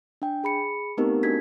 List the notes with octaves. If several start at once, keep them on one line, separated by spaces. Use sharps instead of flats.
D4 G5
G#4 B5 C#7
A3 B3 C4 D#4 G4 A#4
D4 F#4 A4 G#6 B6